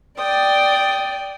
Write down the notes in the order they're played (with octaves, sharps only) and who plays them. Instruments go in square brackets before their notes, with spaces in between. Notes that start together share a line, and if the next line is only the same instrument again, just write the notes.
[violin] D5 [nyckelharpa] G5 D#6